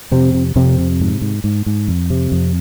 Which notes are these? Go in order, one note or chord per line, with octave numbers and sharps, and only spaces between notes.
F2 C3 C4
C3
F2 C3 C4
C3
G#2
G#2
G#2
G#2
F2
C3
F2